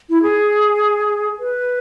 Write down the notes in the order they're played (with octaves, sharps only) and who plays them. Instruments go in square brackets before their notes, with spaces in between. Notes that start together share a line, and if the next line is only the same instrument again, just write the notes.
[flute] E4
G#4
B4